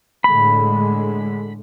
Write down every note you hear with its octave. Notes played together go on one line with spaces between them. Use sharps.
A2 D3 G#3 B5